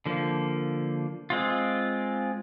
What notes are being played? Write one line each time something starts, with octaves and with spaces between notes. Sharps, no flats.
D3 F3 A#3
G#3 C4 F4